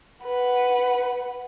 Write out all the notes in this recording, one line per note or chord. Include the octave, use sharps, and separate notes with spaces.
B4 F#5